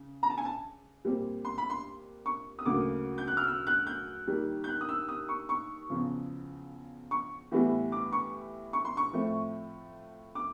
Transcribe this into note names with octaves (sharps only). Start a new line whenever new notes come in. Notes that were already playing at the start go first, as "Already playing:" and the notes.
Already playing: C#3
A#5
A5
G#5
A5
A#2 G3 C4
C6
B5
C6
C#6
D#6
D2 C#3 F#3 A#3 D6
G6
F#6
F6
E6
F#6
G6
D#2 D#3 G3
G6
F#6
D#6
E6
D#6
C#6
C#6
E2 C#3 F3
C#6
A2 E3 G3 B3
D6
C#6
C#6
C6
C#6
A2 F3 A3 C4
D6